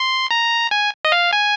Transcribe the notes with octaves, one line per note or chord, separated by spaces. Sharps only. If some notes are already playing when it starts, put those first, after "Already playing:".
Already playing: C6
A#5
G#5
D#5
F5
G#5